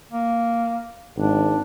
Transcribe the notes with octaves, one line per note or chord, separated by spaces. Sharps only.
A#3
G#1 D4